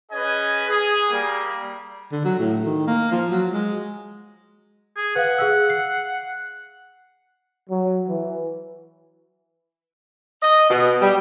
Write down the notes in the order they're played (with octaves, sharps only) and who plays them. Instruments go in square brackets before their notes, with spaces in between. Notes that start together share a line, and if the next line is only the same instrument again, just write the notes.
[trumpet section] C#4 G#4 B4 D#5 G#5
G#4
G3 A#3
[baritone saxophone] D3
F#3
A2
D#3
A#3
F3
F#3
G#3
[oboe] G#4
[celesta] B4 F5 [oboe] F#5
[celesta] G#4 F5 E6
C7
[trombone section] F#3
E3
[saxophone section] D#5
B2
G3